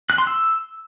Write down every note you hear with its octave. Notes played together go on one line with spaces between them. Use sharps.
F#6
C6
E6